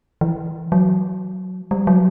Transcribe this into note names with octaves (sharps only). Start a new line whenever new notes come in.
E3
F#3
G3
F#3